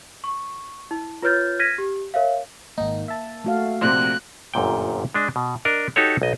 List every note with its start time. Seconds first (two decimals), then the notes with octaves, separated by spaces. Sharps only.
0.24 C#6
0.91 E4
1.22 F4 B4 C#5 F6 G6 A6
1.59 F6 G#6 A#6 B6 D#7
1.78 G4
2.14 A#4 C#5 E5 F5
2.78 G#1 A#3 D#4
3.08 E5 A5
3.44 A3 F#4 F5
3.81 A#1 C3 C5 F#6
4.54 G1 F#2 A#2 G5
5.14 G#3 D4 D#5
5.36 B2
5.65 D4 A#4 D#5
5.96 D#4 F#4 G4 A4 C#5
6.22 B1 D#5